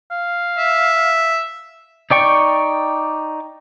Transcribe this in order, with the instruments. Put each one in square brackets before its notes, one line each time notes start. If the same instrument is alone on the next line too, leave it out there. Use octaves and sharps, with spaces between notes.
[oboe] F5
[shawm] E5
[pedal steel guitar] D#4 D5 G5 C#6